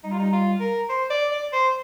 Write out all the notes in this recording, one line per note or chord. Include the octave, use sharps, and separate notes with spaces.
G3 D#4
F4
D#4
F4
A#4
C5
D5
D5
C5